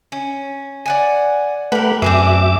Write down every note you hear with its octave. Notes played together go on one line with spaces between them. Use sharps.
C#4
D5 F#5 G#5
A3 G4 A#4 B4 F#5
F#2 C4 D4 G#4 E5 D6